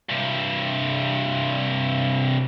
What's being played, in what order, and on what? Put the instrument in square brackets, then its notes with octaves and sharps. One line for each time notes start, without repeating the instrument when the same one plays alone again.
[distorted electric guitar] G2 C3